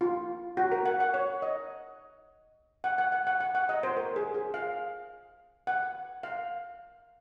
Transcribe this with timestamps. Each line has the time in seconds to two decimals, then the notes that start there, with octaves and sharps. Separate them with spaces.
0.01 F4
0.57 F#4
0.72 A#4
0.86 F#5
1.00 F#5
1.14 C#5
1.42 D#5
2.84 F#5
2.98 F#5
3.12 F#5
3.27 F#5
3.40 F#5
3.55 F#5
3.69 D#5
3.83 C5
3.97 A#4
4.16 G#4
4.34 G#4
4.54 F5
5.67 F#5
6.23 F5